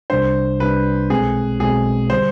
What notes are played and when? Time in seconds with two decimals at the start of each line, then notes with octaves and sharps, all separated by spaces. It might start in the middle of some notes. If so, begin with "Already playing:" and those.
0.10 C2 C3 G3 D4 C5
0.59 C2 C3 G3 D4 B4
1.10 B1 B2 G#3 C4 G#4
1.60 B1 B2 G#3 C4 G#4
2.10 D3 G3 C5